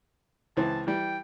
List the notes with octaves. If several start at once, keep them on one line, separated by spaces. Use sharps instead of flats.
C#2 E3 C4 A5
E3 G3 G5